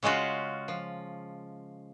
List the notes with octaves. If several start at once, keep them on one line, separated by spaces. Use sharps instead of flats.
C#3 G#3 C#4 F4 F#4
F3